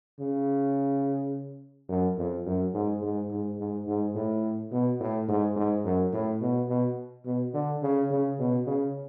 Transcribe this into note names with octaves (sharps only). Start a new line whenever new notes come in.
C#3
F#2
F2
F#2
G#2
G#2
G#2
G#2
G#2
A2
B2
A2
G#2
G#2
F#2
A2
B2
B2
B2
D3
C#3
C#3
B2
C#3